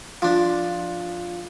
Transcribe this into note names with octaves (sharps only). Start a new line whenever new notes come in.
F3 D4